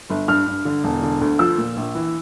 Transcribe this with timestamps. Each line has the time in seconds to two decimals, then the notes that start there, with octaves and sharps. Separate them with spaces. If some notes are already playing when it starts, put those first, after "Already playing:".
0.10 G1
0.28 G2 F6
0.47 G2
0.65 D3
0.84 E1
1.03 D3
1.21 D2
1.39 F3 E6
1.58 A#2
1.77 A#1
1.95 E3